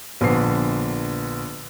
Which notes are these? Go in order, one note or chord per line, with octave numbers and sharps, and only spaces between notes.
A#1 D3 B3 C7